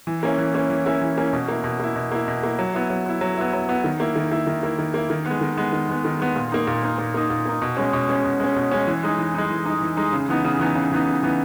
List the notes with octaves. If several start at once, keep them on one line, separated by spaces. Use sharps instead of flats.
E3
A#3 C#4 E4
E3
A#3 C#4 E4
E3
A#3 C#4 E4
E3
A#3 C#4 E4
B2
A#3 E4
B2
A#3 E4
B2
A#3 E4
B2
A#3 E4
F#3
B3 E4
F#3
B3 E4
F#3
B3 E4
F#3
B3 E4
D#3
A#3 E4
D#3
A#3 E4
D#3
A#3 E4
D#3
A#3 E4
D#3
G#3 B3
D#3
G#3 B3
D#3
G#3 B3
D#3
G#3 B3
A#2
A#3 D#4
A#2
A#3 D#4
A#2
A#3 D#4
A#2
A#3 D#4
B2
G#3 C#4
B2
G#3 C#4
B2
G#3 C#4
B2
G#3 C#4
E3
G#3 D#4
E3
G#3 D#4
E3
G#3 D#4
E3
G#3 D#4
C#3
E3 B3 D#4
C#3
E3 B3 D#4
C#3
E3 B3 D#4
C#3
E3 B3 D#4